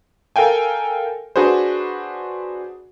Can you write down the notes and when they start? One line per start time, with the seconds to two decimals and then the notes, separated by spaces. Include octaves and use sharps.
0.36 A4 A#4 F5 G5 G#5
1.36 D4 F#4 G#4 B4 C5